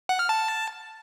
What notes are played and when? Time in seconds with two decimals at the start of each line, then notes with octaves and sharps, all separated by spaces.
0.09 F#5
0.19 F6
0.29 A5